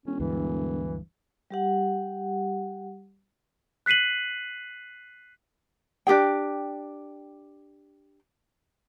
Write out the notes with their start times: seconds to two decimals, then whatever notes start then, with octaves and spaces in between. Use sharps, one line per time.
0.06 E1 C#4
0.20 D2 G2 E3
1.51 G3 G4 F#5
3.86 F#6 B6 C7 D#7 F#7
6.07 D4 G4 G#4 G5